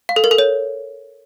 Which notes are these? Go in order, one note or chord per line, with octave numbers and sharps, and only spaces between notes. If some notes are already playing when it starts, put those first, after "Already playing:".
F5
A4
A#4
A4
C#5